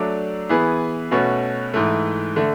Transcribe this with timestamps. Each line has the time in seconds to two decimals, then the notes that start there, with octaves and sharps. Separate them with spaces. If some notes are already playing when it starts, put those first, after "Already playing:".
Already playing: F#3 A3 D4 A4 D5
0.49 E3 B3 E4 G#4 B4
1.11 B2 A3 C#4 F#4 B4
1.74 G#2 E3 A3
2.36 D3 A3